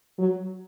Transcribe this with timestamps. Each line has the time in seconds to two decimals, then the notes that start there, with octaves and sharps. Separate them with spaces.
0.19 F#3